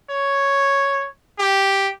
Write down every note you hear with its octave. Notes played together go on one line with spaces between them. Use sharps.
C#5
G4